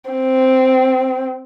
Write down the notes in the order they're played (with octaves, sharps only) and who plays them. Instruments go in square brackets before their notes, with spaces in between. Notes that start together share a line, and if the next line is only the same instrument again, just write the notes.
[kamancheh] C4